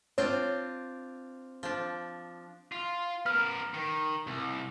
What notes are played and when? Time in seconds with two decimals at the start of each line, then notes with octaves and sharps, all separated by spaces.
0.18 C4 D4 F4 C#5
1.63 F3 D4
2.72 F4
3.26 B3 A#4 F6
3.74 D#3
4.27 C2